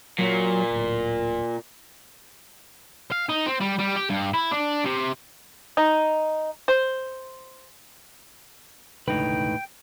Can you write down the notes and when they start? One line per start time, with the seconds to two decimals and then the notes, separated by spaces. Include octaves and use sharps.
0.18 A#2 F#3
0.71 D1
3.12 F5
3.29 D#4
3.46 C4
3.60 G3
3.78 G3
3.96 G4
4.10 G2
4.33 E4
4.52 D4
4.85 C3
5.77 D#4
6.68 C5
9.08 E1 C#2 A2 D3 D#4 B4 G5